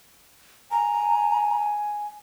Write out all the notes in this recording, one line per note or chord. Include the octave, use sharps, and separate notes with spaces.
G#5 A#5